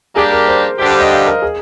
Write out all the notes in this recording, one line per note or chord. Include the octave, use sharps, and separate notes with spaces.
G3 A#3 D4 G4 G#4
A#4
C5
G2 D3 G3 D4 G4 C5
C5
D#5
F5
A#4
G#4